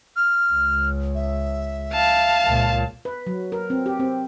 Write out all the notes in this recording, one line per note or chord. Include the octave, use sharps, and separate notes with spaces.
F6
C#2
E5
F5 A5
C#2 A#2
B4
F#3
A#4
C4
G4
C4